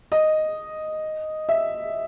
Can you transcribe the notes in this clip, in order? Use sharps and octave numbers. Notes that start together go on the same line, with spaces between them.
D#5
E5